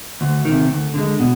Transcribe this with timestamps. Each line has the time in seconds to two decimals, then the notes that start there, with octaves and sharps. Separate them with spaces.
0.21 D2
0.45 C3 D#3
0.69 D2
0.94 D3 G#3
1.19 B2